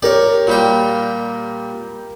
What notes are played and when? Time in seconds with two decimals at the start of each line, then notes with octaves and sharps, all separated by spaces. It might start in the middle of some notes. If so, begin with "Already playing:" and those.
0.02 G4 A#4 C#5 D5
0.47 A#2 G3 G5